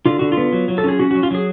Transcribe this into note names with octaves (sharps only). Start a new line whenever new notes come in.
D3 F4
D3 F#4
F4
B3
F#3
F#3
A4
C#4 G#4
C#4 F#4
F#3 F#4
F4
F#3 G#4